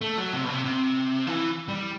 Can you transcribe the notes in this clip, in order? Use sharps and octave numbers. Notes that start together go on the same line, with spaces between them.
A3
F#3
C3
B2
C3
C3
E3
G3